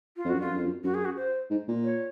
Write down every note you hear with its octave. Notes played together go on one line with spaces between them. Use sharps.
F4
F2
F#2 F#4
F2 F4
F#2
F2
F#2
F#2 F#4
G#4
F#4
C5
G#2
A#2
C#5